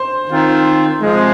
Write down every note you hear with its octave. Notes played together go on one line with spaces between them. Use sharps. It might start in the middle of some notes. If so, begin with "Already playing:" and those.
Already playing: C5
D#3 C4 F4
C3 F3 G#3